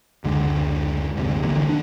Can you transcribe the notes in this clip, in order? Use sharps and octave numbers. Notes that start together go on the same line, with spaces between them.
F#1 D2 D3 G#3
F#1 D2 G#2 C3
A#1 D3 E3 A#3
D#3 D4